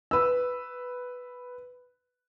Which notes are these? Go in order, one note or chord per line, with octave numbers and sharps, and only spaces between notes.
B4 E6